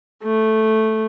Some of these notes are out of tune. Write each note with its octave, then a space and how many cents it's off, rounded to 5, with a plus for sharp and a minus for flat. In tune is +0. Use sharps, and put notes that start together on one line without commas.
A3 -5